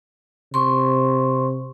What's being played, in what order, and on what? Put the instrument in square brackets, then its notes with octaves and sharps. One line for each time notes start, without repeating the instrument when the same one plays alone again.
[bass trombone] C3 [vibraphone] C6 C#6